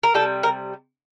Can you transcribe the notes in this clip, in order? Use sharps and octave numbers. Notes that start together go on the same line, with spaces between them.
A#4
C3 G3 A4
A#4